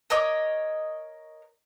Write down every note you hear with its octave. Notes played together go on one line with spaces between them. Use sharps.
A#4 C#5 D#5 D6